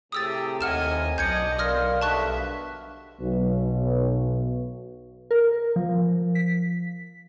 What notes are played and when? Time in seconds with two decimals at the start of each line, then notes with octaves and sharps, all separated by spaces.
0.12 A2 C3 G4 G#4 D#6 E6 A6
0.61 D#2 D#5 F#5 G#5 F6 E7
1.18 B1 D4 D#5 G6 G#6 C#7
1.59 A#4 D5 F5 C6 D#6 F6 A#6
2.01 G2 B2 D3 E5 A5 C#6 F#6
3.20 B1 B2
5.31 A#4
5.76 F3
6.35 B6